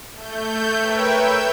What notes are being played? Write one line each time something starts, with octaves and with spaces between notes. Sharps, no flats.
A3 G6
A#4 B4 C#5 E5 G5
E6 G6